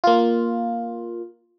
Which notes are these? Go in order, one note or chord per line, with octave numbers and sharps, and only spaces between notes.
A#3 F4